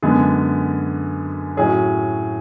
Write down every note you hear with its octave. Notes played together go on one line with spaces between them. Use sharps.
F#2 D3 G#3 B3 G#4
A2 F#3 C#4 G#4